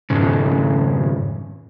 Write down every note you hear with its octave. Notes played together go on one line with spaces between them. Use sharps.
F2 G#2 C#3